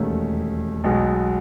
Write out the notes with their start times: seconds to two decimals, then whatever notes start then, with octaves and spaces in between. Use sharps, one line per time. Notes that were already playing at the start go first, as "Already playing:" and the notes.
Already playing: E1 D#2 D#3 A3 C#4
0.84 B1 B2 G#3